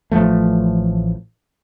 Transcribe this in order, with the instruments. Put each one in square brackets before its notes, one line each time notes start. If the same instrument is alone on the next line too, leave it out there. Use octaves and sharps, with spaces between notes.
[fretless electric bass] A1 D#3 F3 A3